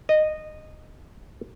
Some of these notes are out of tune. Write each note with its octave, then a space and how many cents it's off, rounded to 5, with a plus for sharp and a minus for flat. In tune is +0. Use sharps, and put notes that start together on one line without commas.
D#5 -15